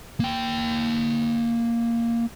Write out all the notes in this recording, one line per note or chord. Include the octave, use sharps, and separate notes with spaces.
A#3 G5